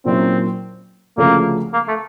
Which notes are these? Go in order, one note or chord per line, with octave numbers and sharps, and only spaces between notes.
A#2 F#3 A#3 C4 C#4 E4
D2 C#3 F3 A3 A#3 C#4
A#3
A3